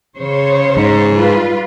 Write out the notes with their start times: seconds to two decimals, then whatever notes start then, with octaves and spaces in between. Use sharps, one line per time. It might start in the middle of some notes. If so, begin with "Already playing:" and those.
0.17 C#3 C5 C#5
0.77 G#2
1.14 G3 F4 B4